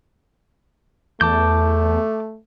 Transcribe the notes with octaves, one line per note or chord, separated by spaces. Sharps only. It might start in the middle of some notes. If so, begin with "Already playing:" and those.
E2 A3 A5 D6 G6